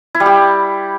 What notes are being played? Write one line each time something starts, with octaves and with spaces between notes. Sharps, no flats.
E4
G3
G4